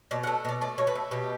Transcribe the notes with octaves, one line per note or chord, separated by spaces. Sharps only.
B2 D5
F#5
A3
B2 D5
A3 D5
B2 C#5
B4
A3
B2 G4